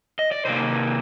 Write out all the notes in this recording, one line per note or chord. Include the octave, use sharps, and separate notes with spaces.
D#5
D5
C3 D#3 A#3 C5